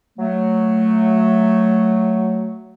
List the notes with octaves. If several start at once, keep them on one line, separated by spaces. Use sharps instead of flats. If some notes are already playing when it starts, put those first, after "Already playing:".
F#3 A3